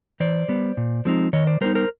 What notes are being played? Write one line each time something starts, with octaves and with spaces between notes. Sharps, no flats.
E3 C5 D5
G3 B3
A#2
F3 G#3 C4 D#4
D#3 C#5 D#5
C5 D5
G3 B3 D#4 A#4 C5
A#4 C5